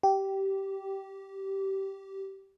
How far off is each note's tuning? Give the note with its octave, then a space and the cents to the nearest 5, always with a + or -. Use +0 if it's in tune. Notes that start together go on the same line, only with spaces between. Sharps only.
G4 -15